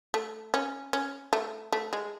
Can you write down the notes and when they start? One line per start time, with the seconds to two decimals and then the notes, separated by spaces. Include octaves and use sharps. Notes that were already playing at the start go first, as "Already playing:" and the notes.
0.14 A3
0.54 C#4
0.93 C#4
1.33 A3
1.73 A3
1.93 G#3